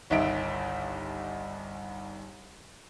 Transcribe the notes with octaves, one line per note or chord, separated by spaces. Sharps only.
G1 C2 D#3 D#4 E5 D7